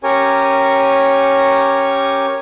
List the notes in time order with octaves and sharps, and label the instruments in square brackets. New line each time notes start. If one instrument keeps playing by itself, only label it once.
[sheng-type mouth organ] C#4 G4 A#4 C#5 G#5 C#6